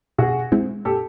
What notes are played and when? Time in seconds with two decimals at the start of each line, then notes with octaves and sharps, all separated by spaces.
0.18 B2 F#4 G#4
0.52 G#3 C4 E4
0.85 A#2 G4 A4